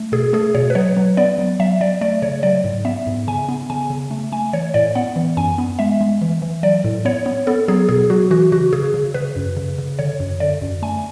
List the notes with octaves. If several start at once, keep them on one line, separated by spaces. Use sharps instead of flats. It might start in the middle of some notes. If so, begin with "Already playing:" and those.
Already playing: A3
B2 G#4
A3 G#4
B2 C#5
B4
F#3 C#5
F#3
B3 D5
F#3
F#3 E5
F#3 D5
A3 D5
C#3 C#5
F#3 D5
G#2
B3 E5
G#2
C#3 G#5
B3
C#3 G#5
C#3
A3
A3 G#5
E3 C#5
A2 D5
B3 F#5
E3
F#2 G#5
B3
G#3 E5
G#3
E3
E3
F#3 D5
A2
B3 C#5
B3
B3 A4
F#3 G#4
B2 G#4
F#3 F#4
E3 F#4
C#3 F#4
C#3 G#4
C#3
C#3 B4
F#2
C#3
C#3
D3 C#5
F#2
D3 D5
F#2
A3 G#5